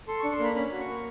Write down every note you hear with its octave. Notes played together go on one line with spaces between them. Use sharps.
A4 C6
D4 C#6
C6
A#3 B5
C#4 B5
F#4
C#6
A#3